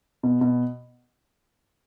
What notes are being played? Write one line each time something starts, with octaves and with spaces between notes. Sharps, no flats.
B2
B2